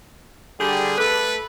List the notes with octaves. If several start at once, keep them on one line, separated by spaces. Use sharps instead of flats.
D3 G3 G4 G#4
A3 A4 B4